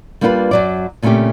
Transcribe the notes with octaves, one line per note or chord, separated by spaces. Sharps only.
G3 A#3 D4 E4 F4 B4
F#2 F#3 D5
A#2 C#3 A3 C4 C#4 G4